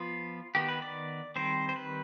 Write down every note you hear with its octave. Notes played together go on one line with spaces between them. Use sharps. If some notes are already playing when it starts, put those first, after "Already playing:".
Already playing: F3 B3 F4
D#3 B3 G4
B4
D5
D#3 G3 C4 C5
C5
B4